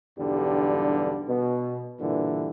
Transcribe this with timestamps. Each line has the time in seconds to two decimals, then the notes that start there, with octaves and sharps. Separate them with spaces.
0.18 B1 E2 G2 D3 G3
1.28 B2
2.00 G2 A#2 D3 E3